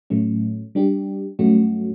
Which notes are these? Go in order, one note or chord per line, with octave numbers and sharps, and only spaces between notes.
A2 F#3 A3 C#4
G3 D4 G4
G2 F#3 A3 C#4 F#4